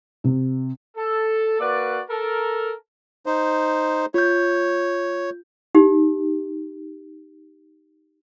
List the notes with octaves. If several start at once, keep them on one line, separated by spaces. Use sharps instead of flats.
C3
A4
A#3 F#4 B4 D5
A4 A#4
D#4 C5
F4 C#5 G6
D#4 G4